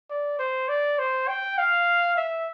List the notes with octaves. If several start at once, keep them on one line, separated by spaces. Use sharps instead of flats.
D5
C5
D5
C5
G5
F5
E5